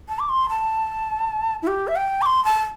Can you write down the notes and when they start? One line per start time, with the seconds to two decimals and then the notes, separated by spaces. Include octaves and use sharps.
0.09 A5
0.19 D6
0.29 C6
0.49 A5
1.62 E4
1.67 G4
1.88 E5
1.96 G5
2.22 D6
2.26 C6
2.45 A5